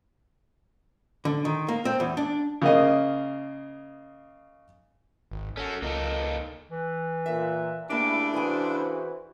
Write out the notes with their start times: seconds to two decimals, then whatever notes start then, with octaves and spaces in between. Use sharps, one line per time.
1.25 D3
1.45 D#3
1.68 A#3
1.85 C4
2.00 E2
2.17 D4
2.62 C#3 A#3 D#5
5.32 G#1
5.57 C#4 F#4 A4
5.82 C#2 A#3 D#4 A4
6.71 E3
7.26 A#2 E5
7.90 C#3 A3 A#3 D4 E4 G4 D6
8.33 E3 E4 F#4 G#4 A4 C5 G#5